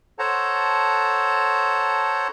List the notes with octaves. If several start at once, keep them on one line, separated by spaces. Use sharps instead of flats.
A4 C5 C#5 F#5 A5 A#5